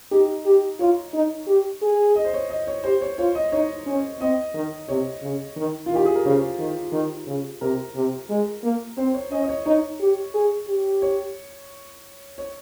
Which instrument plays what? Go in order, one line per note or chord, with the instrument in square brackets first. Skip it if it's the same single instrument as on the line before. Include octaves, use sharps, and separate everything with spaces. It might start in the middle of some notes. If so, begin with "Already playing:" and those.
[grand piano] D#4 [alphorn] G4
[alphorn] G4
[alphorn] F4 [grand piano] C#5
[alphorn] D#4
G4
G#4
[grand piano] D#5
C5
C#5
D#5
C#5
[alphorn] G4 [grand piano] C5
[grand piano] C#5
[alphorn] F4 [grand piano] C#5
[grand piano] D#5
[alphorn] D#4 [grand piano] C#5
[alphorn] C#4
[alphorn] C4 [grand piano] D#5
[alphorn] D#3
[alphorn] C3 [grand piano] C#5
[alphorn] C#3
D#3
[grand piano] F4
[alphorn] D#3 [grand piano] G4
[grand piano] G#4
A#4
[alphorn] C#3 [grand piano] C5
[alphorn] D#3
D#3
C#3
[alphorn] C3 [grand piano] A#4
[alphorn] C3
G#3
A#3
[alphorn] C4 [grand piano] C5
[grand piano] C#5
[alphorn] C#4 [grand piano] D#5
[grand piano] D#5
C#5
[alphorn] D#4 [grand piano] C#5
[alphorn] G4
G#4
G4
[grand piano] C#5
C#5